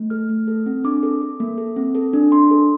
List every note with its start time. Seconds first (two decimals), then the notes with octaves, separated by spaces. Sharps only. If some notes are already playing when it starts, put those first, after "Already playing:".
Already playing: A3
0.10 A4 F6
0.29 A3
0.48 A4
0.66 C4
0.84 D4 D6
1.03 A4
1.22 A4
1.40 A#3
1.58 A4
1.76 C4
1.95 A4
2.13 D4
2.32 D4 C6
2.51 A4